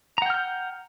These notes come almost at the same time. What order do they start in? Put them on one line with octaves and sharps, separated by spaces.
A#5 F#5 G5 F6 G6